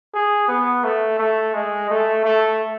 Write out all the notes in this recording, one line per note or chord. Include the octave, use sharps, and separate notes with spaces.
G#4
B3
A3
A3
G#3
A3
A3